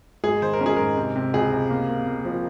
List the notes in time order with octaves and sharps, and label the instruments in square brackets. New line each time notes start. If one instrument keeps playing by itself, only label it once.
[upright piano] G#2 [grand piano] G#4
[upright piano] D#3 [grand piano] C5
[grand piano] A#4
[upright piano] C#4
[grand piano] G#4
[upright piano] G#2 [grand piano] A#4
[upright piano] C3
C3
[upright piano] C#2 [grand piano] G#4
[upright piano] C3
A#3
A#3
A#3
F3